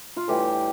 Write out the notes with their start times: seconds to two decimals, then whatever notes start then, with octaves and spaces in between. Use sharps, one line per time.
0.17 F4
0.28 A2 E3 G3 G4